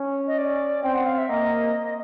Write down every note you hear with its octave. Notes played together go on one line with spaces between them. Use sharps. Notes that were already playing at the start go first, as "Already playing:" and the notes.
Already playing: C#4
D#5
D5
C4 G5
F#5
F5
E5
A#3 D#5